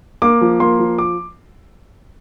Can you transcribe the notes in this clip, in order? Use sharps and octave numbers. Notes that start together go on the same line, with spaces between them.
A#3 D6
F3
A#3 C6
F3
D6